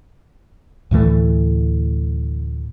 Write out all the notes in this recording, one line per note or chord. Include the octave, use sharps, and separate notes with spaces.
D2 A2 E3 A3